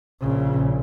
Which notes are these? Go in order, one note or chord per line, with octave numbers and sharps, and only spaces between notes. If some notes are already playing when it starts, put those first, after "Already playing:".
A#1 C#3